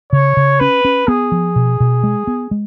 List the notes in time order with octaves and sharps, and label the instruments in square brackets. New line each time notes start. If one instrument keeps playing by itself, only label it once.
[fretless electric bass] C#3 [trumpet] C#5
[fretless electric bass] C#3
[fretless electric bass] C#4 [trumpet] B4
[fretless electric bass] C#4
[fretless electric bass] B3 [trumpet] G#4
[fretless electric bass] F3
B2
B2
G#3
B3
G#3